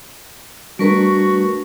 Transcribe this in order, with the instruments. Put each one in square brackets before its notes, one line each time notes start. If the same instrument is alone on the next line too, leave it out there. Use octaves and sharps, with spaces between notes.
[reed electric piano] G3 D4 A#4 [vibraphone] A3 B4 C#6 [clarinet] F#4